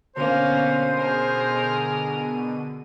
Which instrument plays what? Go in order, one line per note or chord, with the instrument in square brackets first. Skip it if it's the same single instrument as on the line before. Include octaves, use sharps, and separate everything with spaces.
[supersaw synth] B2 D3 D#7 [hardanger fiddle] A#3 C#4 [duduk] C5
[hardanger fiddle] G#4 A#4